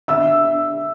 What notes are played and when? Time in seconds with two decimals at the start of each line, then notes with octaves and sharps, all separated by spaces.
0.08 D3 E5 E6
0.44 D4